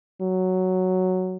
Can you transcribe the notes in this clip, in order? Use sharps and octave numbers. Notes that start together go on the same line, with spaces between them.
F#3